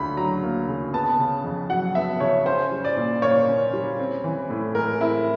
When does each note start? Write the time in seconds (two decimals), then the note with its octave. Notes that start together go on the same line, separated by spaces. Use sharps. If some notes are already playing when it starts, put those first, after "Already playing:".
Already playing: D2 C#3 B5
0.17 F#3 A#5
0.43 A#3
0.68 C#3
0.94 B3 A5
1.19 C#3
1.44 F2
1.70 F#3 F#5
1.95 B3 E5
2.20 C#3 C#5
2.46 C#4 C5
2.72 G3
2.85 D5
2.97 A#2
3.22 A#3 C#5
3.48 C#4
3.73 G3
3.99 C4
4.24 E3
4.50 A2
4.75 G#3 A#4
5.00 C4 E4